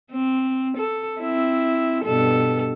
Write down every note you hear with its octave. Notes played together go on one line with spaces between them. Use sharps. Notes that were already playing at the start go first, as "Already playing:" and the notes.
C4
A4
C4 E4
G2 B2 A4